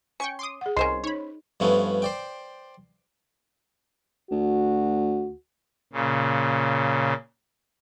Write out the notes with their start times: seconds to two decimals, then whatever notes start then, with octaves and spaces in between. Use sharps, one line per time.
0.20 C#4 G5 C#6 C#7
0.39 C6 D6 D#6
0.61 G#4 F#5
0.77 C2 C#4 A#4 C5 D#5 C6
1.04 D#4 C#5 B5
1.60 G2 F3 A3 B3 C#4
2.02 C5 D5 G5
4.31 D2 F#4
5.93 A#2 C#3